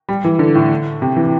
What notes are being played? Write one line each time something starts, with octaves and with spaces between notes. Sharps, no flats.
G3
E3
D3
A2
C3
E3